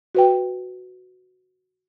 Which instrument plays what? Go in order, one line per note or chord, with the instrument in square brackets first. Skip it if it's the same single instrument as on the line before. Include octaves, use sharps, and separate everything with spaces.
[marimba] F#4 B4 G5